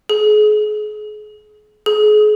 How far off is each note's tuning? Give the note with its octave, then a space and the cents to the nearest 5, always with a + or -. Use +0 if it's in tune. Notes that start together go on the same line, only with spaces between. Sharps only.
G#4 +35
G#4 +35